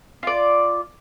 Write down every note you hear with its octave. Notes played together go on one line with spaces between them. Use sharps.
F4 D5